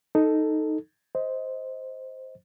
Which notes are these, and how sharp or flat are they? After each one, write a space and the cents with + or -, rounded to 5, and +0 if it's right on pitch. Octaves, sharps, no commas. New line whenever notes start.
D#4 +0 A4 +0
C5 +0 D#5 +20